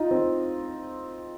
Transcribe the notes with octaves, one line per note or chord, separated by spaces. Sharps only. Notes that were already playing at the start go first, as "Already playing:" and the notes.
Already playing: D#4 F4
C4